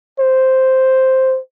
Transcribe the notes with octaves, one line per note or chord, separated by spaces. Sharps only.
C5